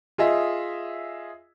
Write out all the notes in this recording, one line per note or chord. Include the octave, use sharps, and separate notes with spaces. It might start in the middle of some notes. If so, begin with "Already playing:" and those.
F4 G#4 D#5 E5